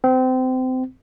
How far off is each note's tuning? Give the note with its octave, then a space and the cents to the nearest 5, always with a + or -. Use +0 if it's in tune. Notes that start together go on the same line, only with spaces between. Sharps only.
C4 -25